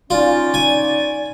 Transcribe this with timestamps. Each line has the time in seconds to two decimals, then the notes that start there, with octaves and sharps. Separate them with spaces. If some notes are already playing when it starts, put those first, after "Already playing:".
0.10 C#4 D#4 F4 D5
0.54 G#5